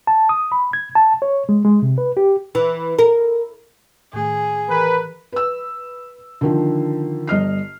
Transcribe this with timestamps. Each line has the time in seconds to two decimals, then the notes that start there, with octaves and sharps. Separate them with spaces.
0.07 A5
0.29 D#6
0.52 B5
0.73 G#6
0.95 A5
1.22 C#5
1.49 G#3
1.65 G#3
1.82 C3
1.98 B4
2.17 G4
2.55 E3
2.99 A#4
4.13 A2 D#3 A3 G#4
4.69 E3 A#4 B4
5.32 B4 E6
6.41 D3 D#3 F3
7.28 G1 D#5 F6 C7